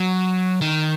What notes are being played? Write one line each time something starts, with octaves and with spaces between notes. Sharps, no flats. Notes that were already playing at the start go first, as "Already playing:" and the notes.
Already playing: F#3
D#3